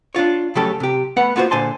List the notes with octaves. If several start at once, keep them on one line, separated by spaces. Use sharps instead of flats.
D4 E4 F4 C#5
C#3 F#3 A3 C#4 G4 A4
C3 G4
A3 B3 B4 F#5
A#3 B3 F4 F#4 A4 C5
A#2 D3 C5 G#5 A5 C6